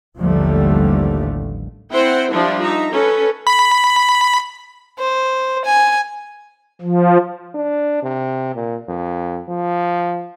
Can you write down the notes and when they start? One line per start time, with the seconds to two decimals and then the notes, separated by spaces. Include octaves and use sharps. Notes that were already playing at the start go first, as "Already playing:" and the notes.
0.20 A1 D#2 D3 F3 G3 A3
1.91 C4 E4 C5 F#5 G5
2.32 F3 G3 D4 E4 F4 G4
2.62 D#4 E5 A#5
2.92 C#4 A4 B4
3.47 B5
4.99 C5
5.65 G#5
6.81 F3
7.55 D4
8.03 C3
8.55 A#2
8.88 F2
9.48 F3